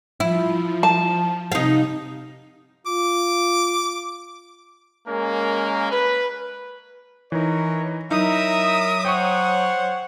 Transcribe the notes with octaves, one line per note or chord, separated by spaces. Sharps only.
F3 E4
A5
C3 D#4 F5
F4 D6
G#3 A#3 C#4 A#4
B4
E3 D#4 A#4 C#5
F#3 D#4 E4 A#4 E5 A#5 D#6
C5 C#5 F#5 G5 C#6